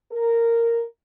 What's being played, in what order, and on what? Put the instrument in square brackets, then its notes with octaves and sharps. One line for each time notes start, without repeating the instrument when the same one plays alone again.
[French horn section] A#4